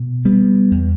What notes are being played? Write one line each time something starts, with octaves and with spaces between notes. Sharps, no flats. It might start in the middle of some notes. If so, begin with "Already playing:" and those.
Already playing: B2
G3 B3
E2